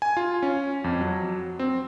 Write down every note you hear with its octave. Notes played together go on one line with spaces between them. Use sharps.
G#5
F4
C#4
F2
F#3
C4